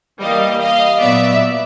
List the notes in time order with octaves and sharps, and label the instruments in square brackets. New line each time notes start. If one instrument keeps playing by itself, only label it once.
[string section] E3 G3 A#3 D#5 F5
D#5 F5
A#2 F#3 B3 D5 E5